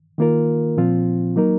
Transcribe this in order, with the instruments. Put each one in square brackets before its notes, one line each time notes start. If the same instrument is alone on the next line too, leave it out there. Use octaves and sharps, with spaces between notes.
[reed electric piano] D#3 A#3 F4 A#4
A#2 F3 C4 F4
F#3 A#3 D#4 A#4